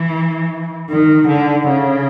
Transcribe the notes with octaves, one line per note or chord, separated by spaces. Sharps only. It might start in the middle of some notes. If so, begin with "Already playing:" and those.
Already playing: E3
D#3
D3
C#3